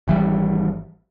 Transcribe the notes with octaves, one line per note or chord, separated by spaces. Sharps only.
G#1 E3 G3